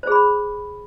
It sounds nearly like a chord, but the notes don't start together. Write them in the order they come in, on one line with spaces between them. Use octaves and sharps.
C5 G#4 B5